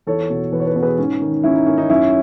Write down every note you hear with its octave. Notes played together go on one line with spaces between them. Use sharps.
E2 A4 C#5
B2
E2 B4
C#5
B4
B2 C#5
G#4 B4
G#2 C#4
D#3
G#2 C#4 E4
D#4
D#3 C#4
D#4
F#2 C#4 E4